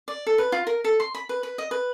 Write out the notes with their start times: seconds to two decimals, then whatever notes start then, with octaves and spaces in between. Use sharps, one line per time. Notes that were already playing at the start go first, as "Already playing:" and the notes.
0.08 D5
0.26 A4
0.38 B4
0.52 F4
0.67 A#4
0.84 A4
1.00 C6
1.15 B5
1.29 B4
1.43 B4
1.58 D#5
1.71 B4